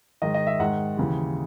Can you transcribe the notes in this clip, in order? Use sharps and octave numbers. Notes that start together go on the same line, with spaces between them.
G#2 D#3 D#5
D#5
E5
G#2 D#3 F#5
D#2 C#3 E3